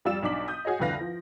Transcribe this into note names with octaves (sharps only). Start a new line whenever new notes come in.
F2 G3 F4 D5 E6 E7
B1 D4 D#4 D6 B6 F#7
D#6 G6
F#4 G#4 C#5 D#5
C2 F2 D3 B4 F5 A#6
F3